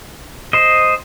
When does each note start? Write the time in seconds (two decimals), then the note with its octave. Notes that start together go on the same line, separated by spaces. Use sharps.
0.53 C5 D#5